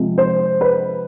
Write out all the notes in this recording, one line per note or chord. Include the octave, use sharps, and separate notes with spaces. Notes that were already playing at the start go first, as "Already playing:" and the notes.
Already playing: C3 F3 G#3
C5
B4